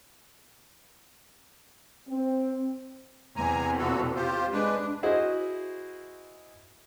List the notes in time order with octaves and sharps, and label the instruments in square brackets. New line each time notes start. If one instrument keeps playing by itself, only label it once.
[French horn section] C4
[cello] E2 C3 [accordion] G#5 A#5
[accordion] A#2 F#4 A4
F4 G4 C5
[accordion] G#3 B4 [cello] D4
[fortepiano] E4 F#4 G#4 C5 D#5